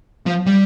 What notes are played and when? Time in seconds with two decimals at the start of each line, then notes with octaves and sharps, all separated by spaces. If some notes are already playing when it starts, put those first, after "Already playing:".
0.26 F3
0.46 G3